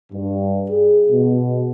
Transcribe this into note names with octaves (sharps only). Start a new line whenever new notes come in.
G2
G#4
B2